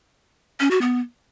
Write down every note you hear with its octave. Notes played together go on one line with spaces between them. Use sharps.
C#4
F#4
B3